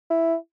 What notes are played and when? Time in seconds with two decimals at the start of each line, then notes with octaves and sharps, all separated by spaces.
0.10 E4